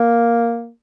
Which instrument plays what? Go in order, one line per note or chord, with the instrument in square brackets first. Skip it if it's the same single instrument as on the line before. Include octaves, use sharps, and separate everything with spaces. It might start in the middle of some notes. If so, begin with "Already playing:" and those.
Already playing: [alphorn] A#3